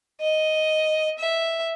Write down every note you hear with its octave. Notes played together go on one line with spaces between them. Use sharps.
D#5
E5